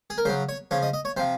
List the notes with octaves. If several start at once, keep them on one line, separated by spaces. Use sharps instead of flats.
G#4
A#4
C#3 F#3 C5
C#5
C#3 F3 C#5
D#5
D#5
C#5
C3 F3 C5